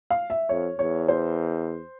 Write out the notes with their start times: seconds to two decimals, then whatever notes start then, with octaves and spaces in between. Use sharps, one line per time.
0.10 F5
0.30 E5
0.49 F2 C#5
0.79 E2 C#5
1.08 C5